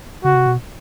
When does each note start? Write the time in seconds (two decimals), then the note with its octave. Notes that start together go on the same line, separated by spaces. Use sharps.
0.24 C#3 F#4
0.35 C3
0.46 B2